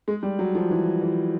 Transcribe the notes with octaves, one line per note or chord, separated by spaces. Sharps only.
G#3
G3
F#3
F3
E3
E3